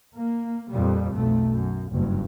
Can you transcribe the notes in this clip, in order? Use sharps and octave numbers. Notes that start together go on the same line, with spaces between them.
A#3
F2 A#2 G3
B1 F2 A3
F#2
F#1 G2